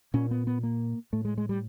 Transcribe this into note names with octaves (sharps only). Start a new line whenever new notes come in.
A#2 C#4
B3
B3
A#3
A2 A3
G#3
G#3
G3